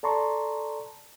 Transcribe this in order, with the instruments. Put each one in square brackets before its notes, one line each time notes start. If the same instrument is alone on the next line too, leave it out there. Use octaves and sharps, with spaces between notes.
[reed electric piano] A4 D5 A5 A#5 C6 C#6